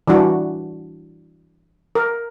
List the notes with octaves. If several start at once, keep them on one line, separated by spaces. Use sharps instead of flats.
E3 G3 D4 F#4
A#4